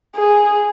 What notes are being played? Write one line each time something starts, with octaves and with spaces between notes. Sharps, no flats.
G#4